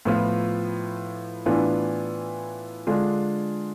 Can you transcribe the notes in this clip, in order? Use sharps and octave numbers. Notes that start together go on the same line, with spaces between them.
A2 F3 B3 F4
A2 E3 B3 D4 F4
D3 G#3 D4 F4